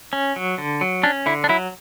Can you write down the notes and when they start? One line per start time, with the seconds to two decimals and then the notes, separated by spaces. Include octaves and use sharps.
0.13 C#4
0.36 F#3
0.58 D3
0.81 F#3
1.03 C#4 D4
1.26 D3 E4
1.44 D4
1.49 F#3 E4